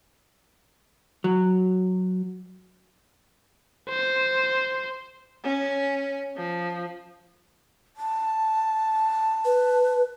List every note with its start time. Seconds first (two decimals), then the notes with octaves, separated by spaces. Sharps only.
1.24 F#3
3.90 C5
5.43 C#4
6.36 F3
7.97 A5
9.45 B4